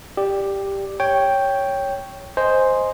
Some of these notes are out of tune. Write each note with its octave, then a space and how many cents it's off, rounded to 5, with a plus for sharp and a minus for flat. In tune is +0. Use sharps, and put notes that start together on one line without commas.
G4 +5 D5 +5
C#5 +0 G5 +0
C5 +0 D#5 +0 G#5 +0